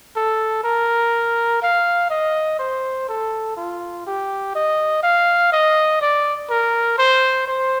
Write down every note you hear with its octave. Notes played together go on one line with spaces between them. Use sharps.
A4
A#4
F5
D#5
C5
A4
F4
G4
D#5
F5
D#5
D5
A#4
C5
C5